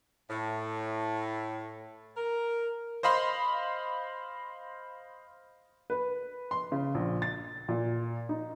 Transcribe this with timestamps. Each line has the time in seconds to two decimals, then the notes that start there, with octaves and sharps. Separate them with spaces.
0.30 A2
2.17 A#4
3.03 C5 D#5 F5 B5 C6
5.90 B4
6.51 C6
6.72 C#3
6.94 A#1
7.22 A6
7.69 A#2
8.29 D#4